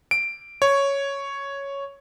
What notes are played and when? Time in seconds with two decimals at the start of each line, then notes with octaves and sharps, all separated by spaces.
0.11 D7
0.62 C#5